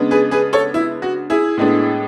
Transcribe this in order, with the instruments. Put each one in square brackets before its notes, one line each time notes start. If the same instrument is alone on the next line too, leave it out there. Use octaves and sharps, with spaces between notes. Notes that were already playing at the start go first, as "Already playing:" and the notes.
Already playing: [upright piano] C#3 G#3 B3 D4
G#4 B4
G#4 B4
A4 C#5
E4
F#4
E4 G#4
A2 G#3 B3 D4